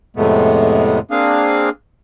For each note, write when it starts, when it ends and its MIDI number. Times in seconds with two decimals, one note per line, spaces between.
0.17 0.99 41
0.17 0.99 45
0.17 0.99 48
0.17 0.99 56
0.17 0.99 57
0.17 0.99 59
1.11 1.70 58
1.11 1.70 60
1.11 1.70 62
1.11 1.70 68
1.11 1.70 77